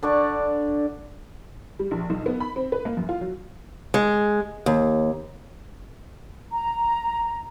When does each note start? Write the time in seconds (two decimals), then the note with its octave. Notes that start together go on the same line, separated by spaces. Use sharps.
0.03 D3 D4 D5 C#6
1.79 G3
1.91 A#1
2.10 B1
2.26 B3
2.40 B5
2.56 C4
2.72 B4
2.85 A#3
2.97 F#2
3.09 F4
3.21 F#3
3.94 G#3
4.66 D#2
6.52 A#5